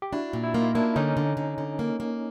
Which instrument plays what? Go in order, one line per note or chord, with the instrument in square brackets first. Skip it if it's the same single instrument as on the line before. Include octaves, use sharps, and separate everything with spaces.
[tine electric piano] G4
[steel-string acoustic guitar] D4 [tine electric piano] E4 F#4
[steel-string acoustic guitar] A#2
[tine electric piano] E4
[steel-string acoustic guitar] A#3 [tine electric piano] D#4 F4
[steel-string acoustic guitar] A#3 [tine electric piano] D4 E4
[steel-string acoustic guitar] D3 [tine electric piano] C#4 D#4
[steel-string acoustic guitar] D3
D3
D3
A#3
A#3